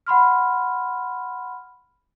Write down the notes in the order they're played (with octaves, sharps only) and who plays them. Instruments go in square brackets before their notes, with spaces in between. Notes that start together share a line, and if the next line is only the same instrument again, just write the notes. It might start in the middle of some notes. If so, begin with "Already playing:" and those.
[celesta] F#5 B5 C6 F6